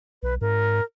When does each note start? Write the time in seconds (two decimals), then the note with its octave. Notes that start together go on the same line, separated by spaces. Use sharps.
0.23 B1 B4
0.41 G#2 A#4